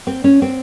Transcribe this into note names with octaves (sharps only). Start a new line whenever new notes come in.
C4
C#4
C4